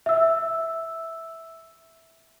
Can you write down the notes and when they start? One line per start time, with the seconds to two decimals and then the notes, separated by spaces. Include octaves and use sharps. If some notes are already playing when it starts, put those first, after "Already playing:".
0.06 E5 E6